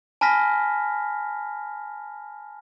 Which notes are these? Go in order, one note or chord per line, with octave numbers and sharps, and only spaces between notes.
G#5 A5 B5 F6 A#6 B6